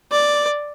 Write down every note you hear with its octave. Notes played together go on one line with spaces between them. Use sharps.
D5